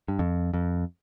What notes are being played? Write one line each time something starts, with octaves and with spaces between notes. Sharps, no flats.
G2
F2
F2